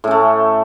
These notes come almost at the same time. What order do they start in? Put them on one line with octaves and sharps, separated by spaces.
A2 C#4 A3